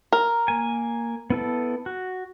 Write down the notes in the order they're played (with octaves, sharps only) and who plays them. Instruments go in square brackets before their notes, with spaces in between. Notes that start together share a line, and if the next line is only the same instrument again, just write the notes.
[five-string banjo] A#4
[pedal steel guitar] A#3 G#5
B3 E4 A4
F#4